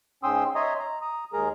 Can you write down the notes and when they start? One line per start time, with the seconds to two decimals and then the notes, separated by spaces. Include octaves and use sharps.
0.23 G#2 C#4 G5 C6 D#6 E6
0.55 C#5 D#5 E5 A#5 C6 D#6
0.79 A#5
1.01 A#5 D#6
1.33 D#2 G#3 G#4 A#4 A#5